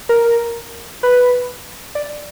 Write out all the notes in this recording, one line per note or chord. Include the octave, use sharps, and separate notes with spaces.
A#4
B4
D5